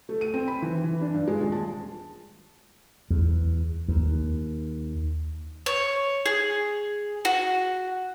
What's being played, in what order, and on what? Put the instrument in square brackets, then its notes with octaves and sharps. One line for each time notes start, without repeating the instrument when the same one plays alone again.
[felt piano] A3
D#7
C4
B5
E3
E3
D4
G2
G#3
D#1
A5
[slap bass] E2
D#2
[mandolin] C#5
G#4
F#4